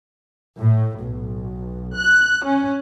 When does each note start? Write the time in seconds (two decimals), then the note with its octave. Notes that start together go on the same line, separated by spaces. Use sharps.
0.59 A2
1.01 B1
1.96 F#6
2.45 C#4